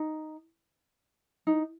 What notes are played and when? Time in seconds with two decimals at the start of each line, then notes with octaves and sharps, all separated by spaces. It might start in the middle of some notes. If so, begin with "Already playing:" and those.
Already playing: D#4
1.47 D#4